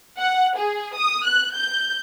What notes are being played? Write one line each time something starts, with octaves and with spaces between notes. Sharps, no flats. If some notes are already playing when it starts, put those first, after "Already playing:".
F#5
G#4
D#6
F#6
G6